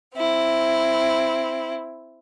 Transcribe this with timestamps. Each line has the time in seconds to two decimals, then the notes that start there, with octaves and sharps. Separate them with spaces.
0.15 C4 E4